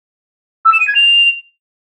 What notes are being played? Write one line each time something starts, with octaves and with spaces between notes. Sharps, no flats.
E6
E7
D#7
G#6
F7